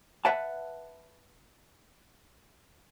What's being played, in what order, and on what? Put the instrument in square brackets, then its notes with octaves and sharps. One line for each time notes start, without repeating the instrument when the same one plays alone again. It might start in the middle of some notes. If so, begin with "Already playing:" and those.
[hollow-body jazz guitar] B4 E5 F#5 A5